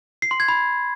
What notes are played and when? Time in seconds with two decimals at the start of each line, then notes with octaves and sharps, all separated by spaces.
0.22 C7
0.31 C6
0.40 G#6
0.48 B5